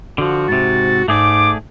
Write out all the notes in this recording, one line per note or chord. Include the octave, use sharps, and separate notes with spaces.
D3 F3 F#4
G#2 C3 A6
G#2 A3 G#4 D5 D6